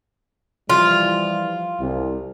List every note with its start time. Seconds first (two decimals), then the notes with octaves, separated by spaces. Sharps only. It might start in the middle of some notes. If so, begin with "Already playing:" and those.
0.70 E3 F3 G3 F4
1.79 C2